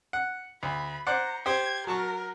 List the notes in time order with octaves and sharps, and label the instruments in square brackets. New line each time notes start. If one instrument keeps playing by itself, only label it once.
[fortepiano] F#5
[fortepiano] D2 [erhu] B5
[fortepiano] C5 D5 F#5 [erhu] A#5
[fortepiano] G4 C5 [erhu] G#6
[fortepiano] F#3 A5 C#6 [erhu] A#4